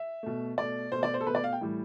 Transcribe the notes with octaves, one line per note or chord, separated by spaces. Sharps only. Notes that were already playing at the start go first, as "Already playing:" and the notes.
Already playing: E5
B2 A3
B2 A3 D5
B2 A3 C5
D5
C5
A4
B2 A3 B4
D5
F5
G5
A2 E3 G3